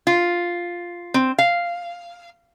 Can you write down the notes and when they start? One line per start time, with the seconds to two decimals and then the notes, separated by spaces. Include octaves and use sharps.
0.07 F4
1.14 C4
1.38 F5